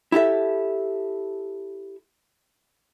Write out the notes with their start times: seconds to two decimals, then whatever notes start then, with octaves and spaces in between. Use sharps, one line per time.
0.12 E4 G4 A4 E5